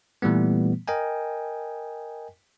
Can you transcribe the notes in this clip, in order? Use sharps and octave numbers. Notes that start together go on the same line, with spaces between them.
A#2 E3 G3 A3 B3
A#4 D#5 G5 G#5